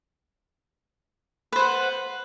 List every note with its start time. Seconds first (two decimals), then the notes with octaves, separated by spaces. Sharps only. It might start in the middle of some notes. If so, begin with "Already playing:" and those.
1.52 B4
1.56 C5
1.59 F#5